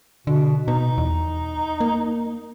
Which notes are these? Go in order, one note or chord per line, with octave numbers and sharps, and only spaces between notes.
B2 D3
B2 D#4
E2
A#3